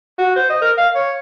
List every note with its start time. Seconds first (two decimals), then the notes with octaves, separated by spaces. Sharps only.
0.19 F#4
0.36 C5
0.50 D#5
0.62 A#4
0.78 F5
0.95 C#5